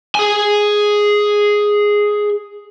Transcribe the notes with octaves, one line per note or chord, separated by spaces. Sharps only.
G#4 G#5